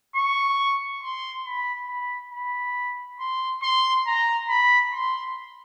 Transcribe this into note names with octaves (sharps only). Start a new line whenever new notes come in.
C#6
C6
B5
B5
B5
C6
C6
A#5
B5
C6